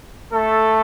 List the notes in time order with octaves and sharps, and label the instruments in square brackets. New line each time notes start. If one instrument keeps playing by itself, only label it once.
[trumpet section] A3 A4